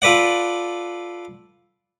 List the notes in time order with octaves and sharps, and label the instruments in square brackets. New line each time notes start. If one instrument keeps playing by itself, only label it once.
[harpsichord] F4 A4 B4 D5 F#5